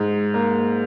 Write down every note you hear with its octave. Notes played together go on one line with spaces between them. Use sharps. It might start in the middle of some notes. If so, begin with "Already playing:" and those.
Already playing: G#2
A#3